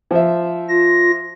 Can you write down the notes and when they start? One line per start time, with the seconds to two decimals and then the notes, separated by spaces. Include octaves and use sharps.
0.11 F3 C5 E5
0.69 F4 A#6